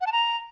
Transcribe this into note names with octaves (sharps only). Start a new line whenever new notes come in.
F#5
A5
A#5